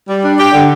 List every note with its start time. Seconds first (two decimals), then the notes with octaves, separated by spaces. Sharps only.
0.09 G3
0.24 D4
0.39 G4
0.53 D3